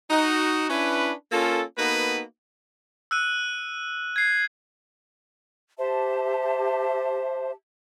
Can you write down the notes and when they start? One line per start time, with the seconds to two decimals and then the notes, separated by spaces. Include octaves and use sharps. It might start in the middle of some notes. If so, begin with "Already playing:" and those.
0.10 D#4 F#4
0.70 C#4 D4 E4 B4
1.32 A#3 C#4 F4 A4
1.77 A#3 B3 D#4 F#4 A4 B4
3.11 E6 F#6 D#7
4.16 G#6 C7
5.79 G4 C5 E5 A5